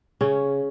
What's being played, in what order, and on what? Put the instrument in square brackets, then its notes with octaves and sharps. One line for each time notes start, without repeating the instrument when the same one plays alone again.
[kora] C#3 C#4